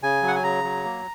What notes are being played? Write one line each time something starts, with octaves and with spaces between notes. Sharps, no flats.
C#3 G#5
F#3
F#5
G#5
C#3 A#5
F#3
A#3